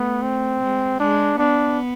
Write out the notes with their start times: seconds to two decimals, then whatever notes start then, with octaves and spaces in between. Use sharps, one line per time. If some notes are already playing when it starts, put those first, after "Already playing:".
Already playing: A3 B3
0.22 C4
0.61 G#3
1.00 G#3 D4
1.38 B3 D4